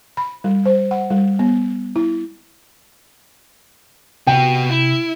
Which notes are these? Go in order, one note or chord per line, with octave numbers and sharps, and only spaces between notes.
B5
G3
C5
F#5
G3
B3
E4
C3 B3 F#4 G5
E4